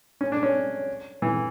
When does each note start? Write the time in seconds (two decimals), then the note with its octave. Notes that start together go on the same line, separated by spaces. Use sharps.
0.21 C#4
0.32 D4
0.43 C#4
1.22 E3